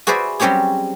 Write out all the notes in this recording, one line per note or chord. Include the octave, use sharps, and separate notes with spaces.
F#4 G#4 B4 C5 D5 E5
F#3 G3 C4 C#4 G4 G#4